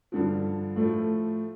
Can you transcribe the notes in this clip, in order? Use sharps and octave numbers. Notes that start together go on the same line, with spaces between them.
G2 D3 F3
A2 F3 A3